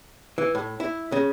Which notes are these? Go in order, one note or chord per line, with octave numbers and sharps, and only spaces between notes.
E3
A2
E4
C#3